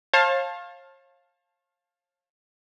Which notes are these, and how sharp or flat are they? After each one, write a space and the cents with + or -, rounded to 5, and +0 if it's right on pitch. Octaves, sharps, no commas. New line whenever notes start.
C#5 -45 F5 +5 A5 +0